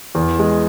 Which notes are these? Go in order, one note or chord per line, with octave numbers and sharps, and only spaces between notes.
E2
G#3